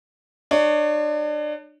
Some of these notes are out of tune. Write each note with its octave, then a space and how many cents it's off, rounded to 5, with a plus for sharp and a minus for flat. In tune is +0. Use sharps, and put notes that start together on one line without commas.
D4 +35 C#5 +25